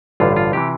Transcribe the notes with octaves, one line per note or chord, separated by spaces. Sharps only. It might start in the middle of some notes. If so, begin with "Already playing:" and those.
A1 G2 D3 F4
F4
C3 E3 G4